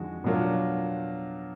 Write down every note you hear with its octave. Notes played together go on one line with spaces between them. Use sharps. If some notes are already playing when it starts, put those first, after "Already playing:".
Already playing: F2 D3 G#3 D#4 F#4
B2 F#3 D4 F4 A#4